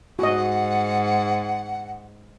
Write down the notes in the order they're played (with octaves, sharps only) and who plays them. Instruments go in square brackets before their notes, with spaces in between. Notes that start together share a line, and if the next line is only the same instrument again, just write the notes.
[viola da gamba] G#2 [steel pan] F#4 D#5 [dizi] F#5